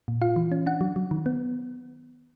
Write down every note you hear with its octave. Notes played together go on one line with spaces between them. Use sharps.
A#2
F4 F5
E3
C#4
D4 F#5
F#3
F#3
D#3
B3